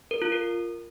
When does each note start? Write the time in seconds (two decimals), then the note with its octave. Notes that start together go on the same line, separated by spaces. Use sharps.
0.11 A#4
0.22 F4
0.32 A#4